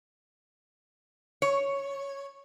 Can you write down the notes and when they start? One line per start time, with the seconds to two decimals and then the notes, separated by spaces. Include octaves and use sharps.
1.42 C#5